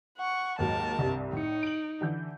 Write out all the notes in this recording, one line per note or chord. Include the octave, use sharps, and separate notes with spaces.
F#5 C#6
D#2 G#2 F#3 A#4 A5
C2 G2 C3
A2 D#4 C#7
D7 F#7
D3 E3 G6